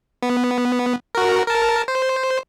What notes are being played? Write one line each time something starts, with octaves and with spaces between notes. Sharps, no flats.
B3
F#4 A#4
A#4 A5
C5